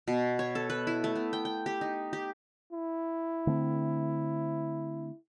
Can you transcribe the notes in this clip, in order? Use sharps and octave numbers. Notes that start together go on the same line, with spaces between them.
B2
C#5
A4
B4
E4
A3
B3
G5
G5
G4
D#4
G4
E4
D3 A3 C4